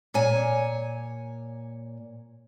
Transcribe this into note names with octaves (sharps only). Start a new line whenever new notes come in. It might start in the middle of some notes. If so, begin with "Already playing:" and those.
A#2 C#5 G#5